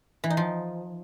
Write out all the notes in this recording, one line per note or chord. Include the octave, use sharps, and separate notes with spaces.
E3
D#4
F3